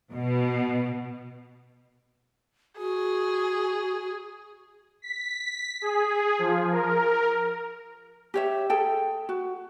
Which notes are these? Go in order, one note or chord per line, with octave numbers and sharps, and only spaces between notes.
B2
F#4 G#4
B6
G#4
F3
A#4
G4 C#5 E5
G#4 A4 G5
F#4